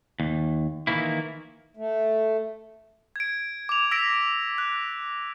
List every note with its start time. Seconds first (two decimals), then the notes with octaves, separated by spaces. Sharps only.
0.20 D#2
0.87 D#3 E3 A#3 E4
1.77 A3
3.16 G#6 D7
3.69 D6 F7
3.91 E6 A#6 B6 D7 F7
4.58 F#6